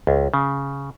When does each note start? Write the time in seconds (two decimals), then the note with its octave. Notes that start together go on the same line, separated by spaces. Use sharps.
0.07 C#2
0.34 C#3